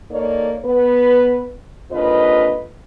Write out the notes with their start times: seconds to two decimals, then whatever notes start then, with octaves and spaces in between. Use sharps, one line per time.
0.11 A#3 D#4 A4 C#5 D5
0.65 B3 B4
1.91 D#2 D3 C4 F4 B4 D#5